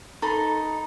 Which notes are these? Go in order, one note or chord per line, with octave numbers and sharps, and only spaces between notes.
D#4 A4 B5 C6